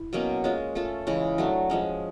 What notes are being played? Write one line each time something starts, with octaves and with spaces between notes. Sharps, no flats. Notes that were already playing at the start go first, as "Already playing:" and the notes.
Already playing: E4
B2 F#3 A#3 C#4
G#3 C#4 F4
A3 C#4 F4 A4
C#3 E3 G#3
F#3 A3 D4
F3 G#3 C#4